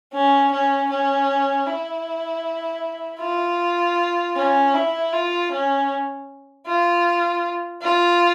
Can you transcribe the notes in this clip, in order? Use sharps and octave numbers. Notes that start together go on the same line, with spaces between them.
C#4
C#4
C#4
E4
F4
C#4
E4
F4
C#4
F4
F4